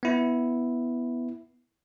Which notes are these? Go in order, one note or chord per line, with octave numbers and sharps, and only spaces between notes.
B3 E4